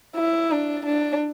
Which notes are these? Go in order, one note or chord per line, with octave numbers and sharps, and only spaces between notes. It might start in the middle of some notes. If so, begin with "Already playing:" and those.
E4
D4
D4